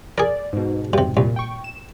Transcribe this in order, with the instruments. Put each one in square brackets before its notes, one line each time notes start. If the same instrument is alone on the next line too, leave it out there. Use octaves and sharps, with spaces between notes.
[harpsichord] G#4 A#4 [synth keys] D5
[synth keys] G#2 B2
[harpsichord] G2 C3
[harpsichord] C2 [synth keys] A#2
[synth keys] G5 C#6
E7